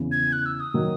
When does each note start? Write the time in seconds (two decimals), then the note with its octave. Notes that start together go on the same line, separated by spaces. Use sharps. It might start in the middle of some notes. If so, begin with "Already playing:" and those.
Already playing: E2 C#3 E3
0.12 G#6
0.33 F#6
0.46 E6
0.60 D#6
0.74 D#3 F#3